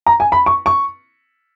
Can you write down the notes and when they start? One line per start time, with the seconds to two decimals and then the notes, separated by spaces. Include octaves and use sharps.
0.06 A#5
0.20 G#5
0.32 B5
0.46 C#6
0.66 C#6